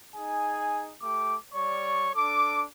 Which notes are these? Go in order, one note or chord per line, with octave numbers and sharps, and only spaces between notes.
D#4 G#4 G#5
A3 G4 D6
G3 C#5 D5 C#6
D4 A4 D6